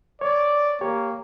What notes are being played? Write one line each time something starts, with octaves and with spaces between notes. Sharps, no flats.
C#5 D5
A#3 G4 C#5